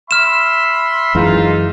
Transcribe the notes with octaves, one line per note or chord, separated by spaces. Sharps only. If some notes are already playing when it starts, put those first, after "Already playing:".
E5 B5 C6 F6 E7
F#2 E3 G#3 D#4 F4